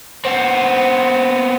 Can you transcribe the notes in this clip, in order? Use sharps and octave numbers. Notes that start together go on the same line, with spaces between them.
B3 C4